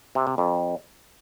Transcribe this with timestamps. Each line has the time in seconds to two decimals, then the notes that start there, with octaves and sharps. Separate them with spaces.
0.15 C3
0.27 C3
0.38 F2